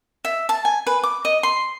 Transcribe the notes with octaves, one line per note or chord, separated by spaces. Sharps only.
E5
A5
G#5
B4
D6
D#5
C6